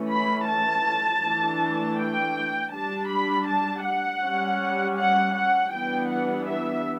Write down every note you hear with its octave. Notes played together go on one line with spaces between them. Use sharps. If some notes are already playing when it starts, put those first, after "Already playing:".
Already playing: E3 A3 C#4
B5
A5
E3 A3 D4
G5
G3 D4 A5
B5
A5
F#5
G3 C#4
F#5
F#5
E3 G3 B3 D4 G5
F#5
E5